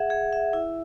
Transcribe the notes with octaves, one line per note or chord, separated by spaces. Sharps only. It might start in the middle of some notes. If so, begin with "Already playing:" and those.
Already playing: G#4 E5 F#5
G#4
E5
E4